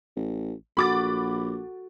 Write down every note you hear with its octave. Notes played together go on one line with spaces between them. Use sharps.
A1
A#1 F#4 A4 B5 D6 A6